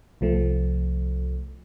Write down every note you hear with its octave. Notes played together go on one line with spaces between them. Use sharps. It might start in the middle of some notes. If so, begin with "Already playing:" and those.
C2 F3 A3